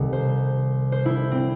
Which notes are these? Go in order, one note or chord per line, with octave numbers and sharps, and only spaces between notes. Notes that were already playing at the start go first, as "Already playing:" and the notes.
Already playing: C2 C3 D#3 A4
C5
C5
E4
C4